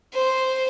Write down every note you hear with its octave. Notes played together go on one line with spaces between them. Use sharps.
C5